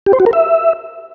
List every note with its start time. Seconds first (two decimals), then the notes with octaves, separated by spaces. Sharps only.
0.06 G4
0.13 C5
0.20 F#4
0.26 A#4
0.33 E5